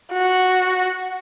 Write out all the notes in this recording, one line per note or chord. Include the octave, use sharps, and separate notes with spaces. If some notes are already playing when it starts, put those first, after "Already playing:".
F#4